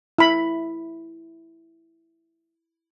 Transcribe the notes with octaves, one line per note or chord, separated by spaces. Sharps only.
E4 B5